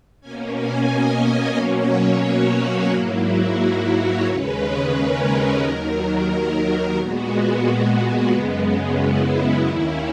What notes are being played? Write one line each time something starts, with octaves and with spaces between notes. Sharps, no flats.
B2 A#3 C#4 G#5
G#5
D#5
B2 F#3 A#3 C#4 C#5
F#4
G#2 F#3 A#3 E4
F#4
E4
C#5
D#2 C#3 G#3 C#4 B4
A#4
D#2 D#3 F#3 A#4
A#4
A#2 G#3 B3 F#4
F#2 C#3 G#3 B3
E4
D#2 D#3 A#3 C#4 E4